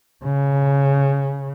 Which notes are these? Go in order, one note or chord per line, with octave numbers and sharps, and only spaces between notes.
C#3